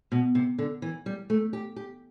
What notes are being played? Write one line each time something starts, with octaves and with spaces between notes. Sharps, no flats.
B2
C3
D3
E3
G3
A3
G4
G4